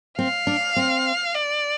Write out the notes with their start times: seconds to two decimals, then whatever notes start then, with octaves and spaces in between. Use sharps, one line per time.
0.19 C4 F5
0.47 D4
0.76 C4
1.34 D5